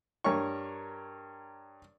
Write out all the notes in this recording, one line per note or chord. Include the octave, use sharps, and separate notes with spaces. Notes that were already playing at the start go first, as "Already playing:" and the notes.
G2 A#4 C#5 C#6